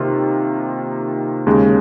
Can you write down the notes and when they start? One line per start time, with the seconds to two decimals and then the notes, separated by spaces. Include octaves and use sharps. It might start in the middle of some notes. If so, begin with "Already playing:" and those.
Already playing: C3 D#3 A#3 F4
1.46 D#2 C#3 G#3